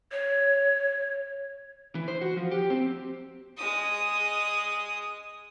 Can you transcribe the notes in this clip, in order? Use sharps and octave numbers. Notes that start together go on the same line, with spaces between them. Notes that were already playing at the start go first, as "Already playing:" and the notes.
C#5
E3
C5
F#4
F3
G4
C4
G#3 D#6